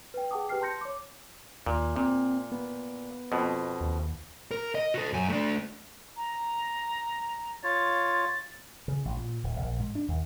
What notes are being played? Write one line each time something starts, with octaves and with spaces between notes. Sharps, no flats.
B4 G5
G#4 F#5 G5 A5 D6 D#6
G4 B4 G5 F6 C7
A5 C6 G6 A#6 C#7
C#5 D6
D#2 A#2
A#2 C4
B3
F2 B2
D#2
A#4
D#5
F#4 A4
F#2 G#5
A3 D4
A#5
F4 C#5 A6
C#3
A1
A#2
D1
A#1
G#2
D4
D#2